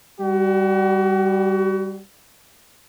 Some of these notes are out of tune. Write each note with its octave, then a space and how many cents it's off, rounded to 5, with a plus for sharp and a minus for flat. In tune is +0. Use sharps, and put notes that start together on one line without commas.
G3 +0 F#4 +35